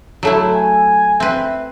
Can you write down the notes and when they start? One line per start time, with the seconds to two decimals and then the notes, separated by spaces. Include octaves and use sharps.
0.23 F#3 A3 E4
0.54 G#5
1.20 C4 B4 E5